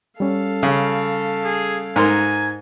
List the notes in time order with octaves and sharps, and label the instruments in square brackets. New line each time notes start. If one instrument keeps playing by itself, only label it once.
[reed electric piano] G3 C#4 [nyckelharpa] A4 F5
[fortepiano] C#3
[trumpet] G#4
[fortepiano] G#2 A#4 C6 [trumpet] G#5